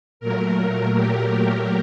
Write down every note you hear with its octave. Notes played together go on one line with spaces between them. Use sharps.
A#2 F#3 A3 A#4
G4